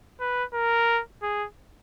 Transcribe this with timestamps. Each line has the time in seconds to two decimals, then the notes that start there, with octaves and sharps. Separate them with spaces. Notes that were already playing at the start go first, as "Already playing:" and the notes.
0.20 B4
0.54 A#4
1.22 G#4